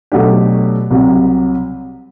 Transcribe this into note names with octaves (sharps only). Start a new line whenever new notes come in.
B2 F#3 A3 D4 G4
C2 C3 F#3